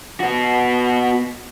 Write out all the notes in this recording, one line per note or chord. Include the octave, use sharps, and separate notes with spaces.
B3 F#4